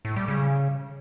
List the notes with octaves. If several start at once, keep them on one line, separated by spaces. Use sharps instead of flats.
A2
G3
C#3